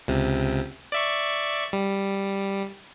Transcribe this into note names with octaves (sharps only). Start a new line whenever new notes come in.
C#2 C3
D5 E5 C#6
G3